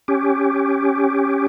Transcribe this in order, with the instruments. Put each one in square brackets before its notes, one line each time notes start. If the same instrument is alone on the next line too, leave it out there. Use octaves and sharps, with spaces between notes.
[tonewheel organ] C#4 G4